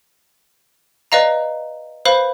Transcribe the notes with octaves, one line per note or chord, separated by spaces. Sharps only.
B4 D5 D#5 F5 A#5
B4 C5 F5 B5